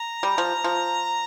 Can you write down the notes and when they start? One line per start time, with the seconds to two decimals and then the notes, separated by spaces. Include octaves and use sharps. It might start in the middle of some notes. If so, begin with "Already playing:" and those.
Already playing: A#5
0.23 G3
0.38 F3
0.64 F3